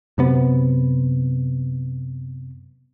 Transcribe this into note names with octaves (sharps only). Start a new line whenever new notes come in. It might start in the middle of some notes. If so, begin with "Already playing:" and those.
F#2 C3 B3